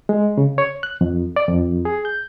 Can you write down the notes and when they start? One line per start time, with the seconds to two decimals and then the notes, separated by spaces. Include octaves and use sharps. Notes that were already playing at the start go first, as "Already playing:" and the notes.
0.09 G#3
0.38 C#3
0.58 C#5
0.83 F#6
1.01 F2
1.36 D5
1.48 F2
1.85 G#4
2.05 G6